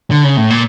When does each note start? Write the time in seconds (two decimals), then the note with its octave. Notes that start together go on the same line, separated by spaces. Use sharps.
0.11 D3
0.24 C#3
0.37 A2
0.50 A#2